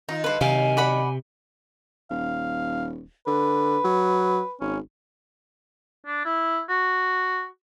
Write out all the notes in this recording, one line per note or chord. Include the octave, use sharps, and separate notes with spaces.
D#3 D#4 F4
D3 G3 B4 C5
F#2 C3 D#3 F5 G#5
D5 F#5 B5
D#1 F5
D3 B4
F#3
G#1 C#4
D4
E4
F#4